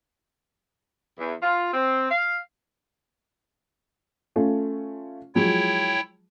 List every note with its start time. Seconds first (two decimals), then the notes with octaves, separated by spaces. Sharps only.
1.18 E2
1.42 F4
1.72 C4
2.10 F5
4.36 A3 C#4 F4
5.35 F3 F#3 G#3 E4 C#5 G5